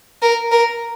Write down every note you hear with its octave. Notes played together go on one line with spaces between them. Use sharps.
A#4
A#4